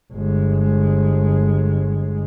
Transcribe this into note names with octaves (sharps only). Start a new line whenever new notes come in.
G1 G#3